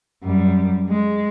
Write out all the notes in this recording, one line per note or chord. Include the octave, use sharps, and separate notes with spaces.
F#2 G3
G#3